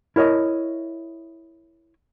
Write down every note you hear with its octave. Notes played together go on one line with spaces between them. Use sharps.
E4 A#4 C#5 D#5 E5